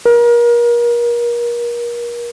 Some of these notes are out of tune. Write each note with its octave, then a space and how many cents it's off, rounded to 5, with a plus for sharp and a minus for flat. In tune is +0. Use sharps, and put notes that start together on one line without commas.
A#4 +35